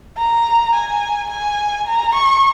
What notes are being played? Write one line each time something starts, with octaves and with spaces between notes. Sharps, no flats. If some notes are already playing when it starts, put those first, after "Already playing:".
A#5
G#5
G#5
A#5
C#6